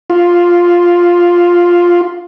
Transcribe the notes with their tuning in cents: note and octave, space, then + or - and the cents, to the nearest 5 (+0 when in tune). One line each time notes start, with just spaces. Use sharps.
F4 +5